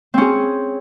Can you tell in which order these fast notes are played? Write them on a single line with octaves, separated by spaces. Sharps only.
C4 C#4 G#4